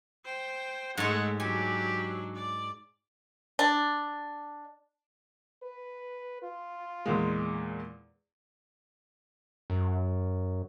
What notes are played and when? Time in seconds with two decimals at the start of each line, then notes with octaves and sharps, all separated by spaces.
0.25 C5 G5
0.97 G#2 G#3 A3 C#5 F#5
1.40 F#3 D4 G4 G#5
2.35 D5
3.59 D4
5.63 B4
6.43 F4
7.06 E2 A#2 G#3
9.70 F#2